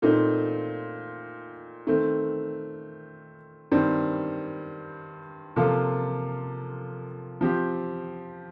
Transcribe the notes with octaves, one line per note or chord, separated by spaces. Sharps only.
A#2 A3 C4 D#4
D#3 A3 C4
G2 D#3 G3 C4
C3 F3 A#3 F4 A4
F3 C4 G4